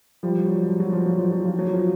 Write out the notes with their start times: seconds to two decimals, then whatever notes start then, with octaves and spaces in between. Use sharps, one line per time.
0.23 F3 G3
0.45 F#3
0.67 F3
0.80 F#3
0.92 F3
1.06 F#3
1.19 F3
1.32 F#3
1.45 F3
1.59 F#3
1.72 F3